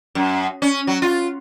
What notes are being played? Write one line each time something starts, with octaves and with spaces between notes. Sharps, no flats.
F#2
C#4
F#3
F4